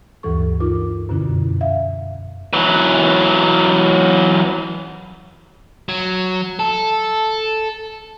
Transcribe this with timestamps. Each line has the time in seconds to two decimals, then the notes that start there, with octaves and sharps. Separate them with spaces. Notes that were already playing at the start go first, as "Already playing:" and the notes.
0.23 D2 G2 E3 A4 C#6
0.60 D#4 F4 A#4 D6
1.09 F#2 B2 D3 C#4 E4
1.61 E5 F5
2.53 E3 F#3
5.89 F#3
6.59 A4